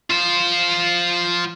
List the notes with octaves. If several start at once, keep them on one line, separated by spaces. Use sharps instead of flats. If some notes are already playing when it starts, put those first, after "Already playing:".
F4 C5